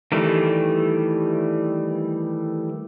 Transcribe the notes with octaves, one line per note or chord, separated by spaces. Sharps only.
D#3 E3 G3 A3